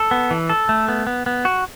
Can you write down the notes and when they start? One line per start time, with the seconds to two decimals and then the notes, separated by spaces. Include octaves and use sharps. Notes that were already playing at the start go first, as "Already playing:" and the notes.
Already playing: A4
0.11 B3
0.31 E3
0.49 A4
0.69 A3
0.88 B3
1.07 B3
1.26 B3
1.45 F#4